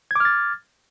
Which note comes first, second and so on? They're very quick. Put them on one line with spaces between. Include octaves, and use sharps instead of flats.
G#6 D6 F6 A6